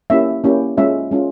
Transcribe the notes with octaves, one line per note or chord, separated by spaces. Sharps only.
A#3 C#4 E4 G4 E5
A#3 C#4 E4 G4
G#3 C#4 F4 E5
G#3 C#4 F4